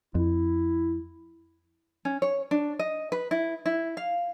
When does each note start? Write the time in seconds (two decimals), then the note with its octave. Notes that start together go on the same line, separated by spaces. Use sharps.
0.15 F2 E4
2.05 C#4
2.22 C#5
2.51 D4
2.79 D#5
3.12 B4
3.31 E4
3.66 E4
3.97 F5